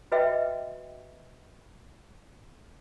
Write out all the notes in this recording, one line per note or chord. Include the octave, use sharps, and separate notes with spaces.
F#4 B4 D#5 E5 G5